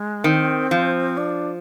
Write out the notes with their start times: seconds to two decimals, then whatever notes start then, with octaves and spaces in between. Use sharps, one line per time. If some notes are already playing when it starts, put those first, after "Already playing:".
Already playing: G#3
0.24 D#3 C4
0.71 F3
1.17 D4